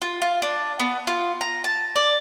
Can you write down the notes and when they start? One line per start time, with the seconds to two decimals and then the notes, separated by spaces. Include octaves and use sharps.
0.02 F4
0.22 F4
0.42 D4
0.80 B3
1.07 F4
1.41 A#5
1.64 A5
1.96 D5